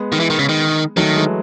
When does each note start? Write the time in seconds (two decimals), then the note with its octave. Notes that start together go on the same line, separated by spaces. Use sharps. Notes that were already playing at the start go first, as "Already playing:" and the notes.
Already playing: G#3 B3
0.12 D#3
0.20 E3
0.30 D#3
0.39 C#3
0.49 D#3
0.97 D#3 F#3 A3
1.16 E3 G#3